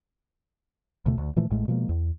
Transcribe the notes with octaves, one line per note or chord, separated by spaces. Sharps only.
D2 B2 A3
D2
A#2 E3 F3 A3
A1 A2 G#3 A3
B2 F3 G#3 A#3
E2